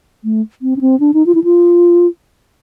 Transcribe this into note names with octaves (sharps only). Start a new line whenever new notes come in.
A3
C4
C#4
C4
D4
D#4
F4
E4
F4